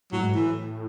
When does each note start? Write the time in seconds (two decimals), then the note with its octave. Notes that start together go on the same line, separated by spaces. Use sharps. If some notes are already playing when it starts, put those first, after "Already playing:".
0.12 A2 F#3
0.21 G#2
0.32 A2 E3